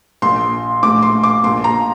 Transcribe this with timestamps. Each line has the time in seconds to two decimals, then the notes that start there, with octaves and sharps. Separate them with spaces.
0.22 A#1 A#2 C6
0.83 A#1 A2 D6
1.02 C6
1.23 D6
1.43 A#1 A#2 C6
1.64 A#5